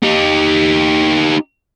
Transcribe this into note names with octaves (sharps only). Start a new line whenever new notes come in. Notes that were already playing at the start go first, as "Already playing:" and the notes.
D#4 G4